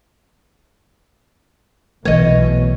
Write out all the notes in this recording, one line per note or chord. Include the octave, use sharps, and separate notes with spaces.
B1 B2 E3 A3 C#5 D#5